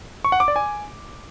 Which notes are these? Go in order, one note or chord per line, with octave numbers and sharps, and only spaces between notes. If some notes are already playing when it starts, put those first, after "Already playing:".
C#6
F#5
D6
D5
G#5